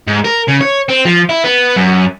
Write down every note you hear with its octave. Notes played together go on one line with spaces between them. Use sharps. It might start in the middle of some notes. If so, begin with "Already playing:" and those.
G#2
A#4
C#3
C#5
C4
F3
E4
B3
F#2